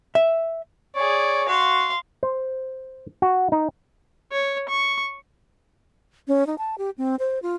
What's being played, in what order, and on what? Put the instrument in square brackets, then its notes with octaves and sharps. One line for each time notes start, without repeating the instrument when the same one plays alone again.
[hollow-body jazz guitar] E5
[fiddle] G#4 D5 [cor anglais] C#5
[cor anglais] F#4 [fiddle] F5 C6
[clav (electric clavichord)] C5
F#4
D#4
[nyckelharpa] C#5
C#6
[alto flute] C#4
D#4
A5
G4
C4
C5
F4